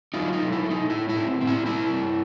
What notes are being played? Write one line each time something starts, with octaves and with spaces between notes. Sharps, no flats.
F#3 D#4 F4
D#4
A3
E4
A3
D#4
A2 E4
E4
C4
C4
E4
G3 E4
G2